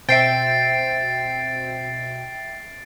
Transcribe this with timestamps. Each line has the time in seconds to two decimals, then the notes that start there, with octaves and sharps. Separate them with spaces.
0.09 B2 C4 E5 G5 A6 C7 D7